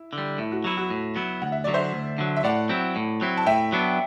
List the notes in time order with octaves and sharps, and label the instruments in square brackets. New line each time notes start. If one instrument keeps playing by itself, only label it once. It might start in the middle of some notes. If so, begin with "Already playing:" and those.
Already playing: [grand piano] E4
[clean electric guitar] D3
G3
[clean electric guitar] A2 [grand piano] E4
[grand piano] F#4
[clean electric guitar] F#3 B3 E4 [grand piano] F#4
[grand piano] F#4
[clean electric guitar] A2
F#3 B3 E4
[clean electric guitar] D2 [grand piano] F#5
[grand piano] E5
[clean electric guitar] D3 F#3 [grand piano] D5
[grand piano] C5 E5
[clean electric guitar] D2
D3 F#3
[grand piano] E5
[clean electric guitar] A2 [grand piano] D5 F#5
[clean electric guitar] F#3 C4 E4
A2
F#3 C4 E4
[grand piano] A5
[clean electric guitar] A2 [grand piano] E5 G5
[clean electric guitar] F#3 B3 D4